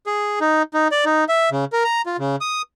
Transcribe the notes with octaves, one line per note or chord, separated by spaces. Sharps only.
G#4
D#4
D#4
D5
D#4
E5
C#3
A#4
A#5
F4
C#3
D#6